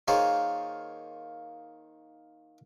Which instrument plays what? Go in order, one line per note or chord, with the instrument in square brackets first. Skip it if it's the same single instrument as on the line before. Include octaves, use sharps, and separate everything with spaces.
[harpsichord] D#3 A#3 F4 G#4 C5 C#5